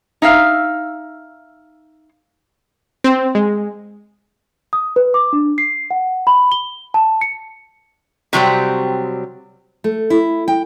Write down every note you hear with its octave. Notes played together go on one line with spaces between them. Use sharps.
D#4 E5 F5
C4
G#3
D#6
B4
D6
D4
C7
F#5
B5
G7
A5
C#7
C3 F#3 G3 C4
A3
E4
G5